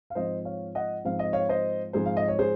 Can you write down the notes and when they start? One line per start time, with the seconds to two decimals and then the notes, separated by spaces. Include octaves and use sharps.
0.10 F5
0.15 G#2 F3 C4 C5 D#5
0.45 C#5 F5
0.75 D#5 F#5
1.05 G#2 F3 C4 F5
1.19 D#5
1.33 C#5 F5
1.49 C5 D#5
1.93 G#2 F3 C4 G#4 C5
2.06 F5
2.17 D#5
2.28 C#5
2.39 G#4 C5